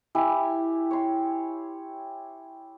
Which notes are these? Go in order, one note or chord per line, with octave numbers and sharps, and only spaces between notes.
E4 G4 G#5
C#5 C6